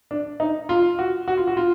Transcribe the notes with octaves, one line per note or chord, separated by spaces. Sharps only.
D4
D#4
F4
F#4
F#4
F4
F#4
F4